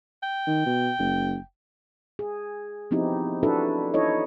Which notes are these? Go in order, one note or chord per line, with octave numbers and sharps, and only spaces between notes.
G5
D#3
B2
F#1
G#4
F3 B3 C4 D#4 E4 G4
D4 E4 F#4 A4 B4 E5
D#4 E4 A4 C#5 D#5